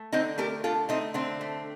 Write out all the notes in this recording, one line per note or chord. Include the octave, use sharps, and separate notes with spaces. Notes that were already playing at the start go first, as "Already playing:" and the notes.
Already playing: A3
D3 C4 D#4
A3 G4 A#4
D3 F4 A4
A3 C4 D#4
D3 A3 C4
A3